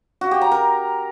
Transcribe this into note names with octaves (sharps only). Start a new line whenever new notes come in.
F#4
G4
A#5
A#4